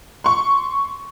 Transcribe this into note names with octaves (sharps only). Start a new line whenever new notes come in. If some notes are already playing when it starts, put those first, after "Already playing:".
C6 C#6